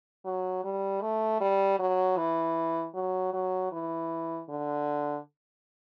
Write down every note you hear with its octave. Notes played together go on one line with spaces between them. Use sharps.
F#3
G3
A3
G3
F#3
E3
F#3
F#3
E3
D3